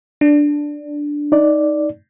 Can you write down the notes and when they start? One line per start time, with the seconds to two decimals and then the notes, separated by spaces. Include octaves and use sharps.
0.21 D4
1.32 D#4 D5